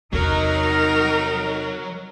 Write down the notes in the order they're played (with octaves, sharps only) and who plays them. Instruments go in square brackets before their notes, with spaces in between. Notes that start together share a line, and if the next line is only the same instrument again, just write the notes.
[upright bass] E2 C3 [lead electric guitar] F#3 [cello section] D#4 [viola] A#4